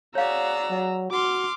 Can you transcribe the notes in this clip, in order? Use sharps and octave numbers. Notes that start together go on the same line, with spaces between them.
F#4 G#4 C#5 D5 F5 A#5 E6
F#3
F#4 C6 D6 F6